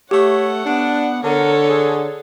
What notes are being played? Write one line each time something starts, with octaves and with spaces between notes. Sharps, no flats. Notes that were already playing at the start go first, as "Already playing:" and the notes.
A3 G4 C#5 F#5
B3 D4
D3 A4 A#4 C#5
G#4